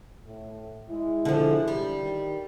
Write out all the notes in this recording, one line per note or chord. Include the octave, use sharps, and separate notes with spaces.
A2
G#3 E4
D3 F3
G3
D#3